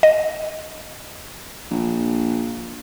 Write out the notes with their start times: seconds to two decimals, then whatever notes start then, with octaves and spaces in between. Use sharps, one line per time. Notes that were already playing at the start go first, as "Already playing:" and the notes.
0.03 D#5
1.71 A#1